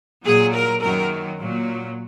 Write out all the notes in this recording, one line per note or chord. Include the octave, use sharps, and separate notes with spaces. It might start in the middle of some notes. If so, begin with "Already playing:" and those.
A#2 F#3 G#4
A#4
F#2 D#3 F#3 A#4
A#2 F#3